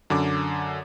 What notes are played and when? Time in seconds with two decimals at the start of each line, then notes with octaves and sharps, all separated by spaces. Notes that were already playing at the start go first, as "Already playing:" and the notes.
0.10 F#2 D3 D6